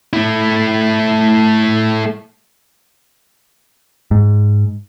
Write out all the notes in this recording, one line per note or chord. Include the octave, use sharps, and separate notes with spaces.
A3 E4
G#2